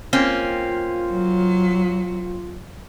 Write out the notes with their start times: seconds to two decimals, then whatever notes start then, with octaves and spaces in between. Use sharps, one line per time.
0.13 A#3 C4 C#4 F4
1.11 F#3